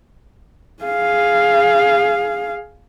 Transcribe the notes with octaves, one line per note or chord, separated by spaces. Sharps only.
G#4 F5